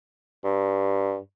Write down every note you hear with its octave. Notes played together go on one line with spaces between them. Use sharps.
G2